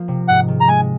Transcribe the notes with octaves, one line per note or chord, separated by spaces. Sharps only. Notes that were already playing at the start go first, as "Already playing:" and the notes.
Already playing: F3 A#3 F4
C3
G#2 F#5
D#3
A#5
G#3 G#5